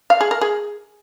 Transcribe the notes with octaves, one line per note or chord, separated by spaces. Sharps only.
F5
G#4
A#4
G#4